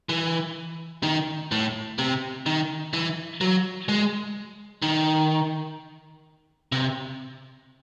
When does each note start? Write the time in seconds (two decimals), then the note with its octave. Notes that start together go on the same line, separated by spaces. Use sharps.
0.09 E3
1.03 D#3
1.52 A2
1.99 C3
2.46 D#3
2.93 E3
3.41 F#3
3.89 G#3
4.82 D#3
6.72 C3